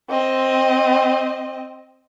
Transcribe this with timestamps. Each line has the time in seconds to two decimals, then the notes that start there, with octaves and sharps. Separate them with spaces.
0.10 C4 D#5